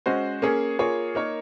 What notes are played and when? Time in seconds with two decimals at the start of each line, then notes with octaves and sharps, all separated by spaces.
0.06 G#3 C#4 F#4 C5
0.42 A#3 C#4 G#4 C#5
0.79 A#3 F4 G#4 C#5
1.15 A#3 D#4 A#4 C#5